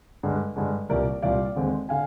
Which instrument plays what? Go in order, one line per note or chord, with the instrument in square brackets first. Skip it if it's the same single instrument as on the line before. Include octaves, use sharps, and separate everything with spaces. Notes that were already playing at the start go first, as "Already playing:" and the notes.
[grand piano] G2 D3 G#3
G2 D3 G#3
C2 A#2 G3 A#4 D5
C2 A#2 G3 D5 F5
D#2 D3 G#3 C4
D3 F5 G#5